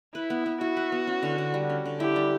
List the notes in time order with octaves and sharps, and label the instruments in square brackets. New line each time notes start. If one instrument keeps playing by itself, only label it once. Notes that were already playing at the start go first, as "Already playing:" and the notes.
[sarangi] E4 [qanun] B4
[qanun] B3
B3
[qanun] E4 [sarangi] F#4
[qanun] B4
B3
C#4
D3
D3
G3
C#4
D3
[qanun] E4 [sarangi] G4
[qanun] G3